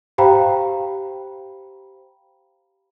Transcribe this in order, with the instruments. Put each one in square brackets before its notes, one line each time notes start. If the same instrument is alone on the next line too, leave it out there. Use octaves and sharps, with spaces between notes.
[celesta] G4 C5 F5 G5 A#5 B5